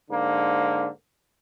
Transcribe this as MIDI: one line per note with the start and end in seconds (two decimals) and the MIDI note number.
0.11 0.88 44
0.11 0.88 50
0.11 0.88 58